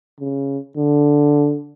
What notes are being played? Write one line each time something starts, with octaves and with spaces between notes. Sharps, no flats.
C#3
D3